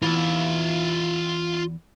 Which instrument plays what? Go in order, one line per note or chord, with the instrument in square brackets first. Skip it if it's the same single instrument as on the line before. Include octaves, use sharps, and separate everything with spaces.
[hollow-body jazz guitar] E2 G2 E3 [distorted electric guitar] F4 E5